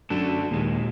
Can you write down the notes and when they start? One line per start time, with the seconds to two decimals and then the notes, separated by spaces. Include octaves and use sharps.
0.10 F#2 D4 F#4 A4
0.51 D#2 A#2 G#3